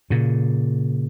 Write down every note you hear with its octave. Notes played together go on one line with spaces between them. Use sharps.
A#2 C#3